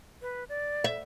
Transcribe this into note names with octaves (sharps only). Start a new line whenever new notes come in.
B4
D5
E5